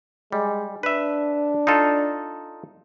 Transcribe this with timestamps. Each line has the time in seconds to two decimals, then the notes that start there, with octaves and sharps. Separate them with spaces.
0.32 G3 G#3
0.83 D4 B4 E5
1.67 D#4 F4 A4